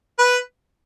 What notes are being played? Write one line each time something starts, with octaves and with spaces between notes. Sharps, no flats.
B4